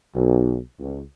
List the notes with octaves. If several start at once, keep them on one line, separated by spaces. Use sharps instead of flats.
B1
C#2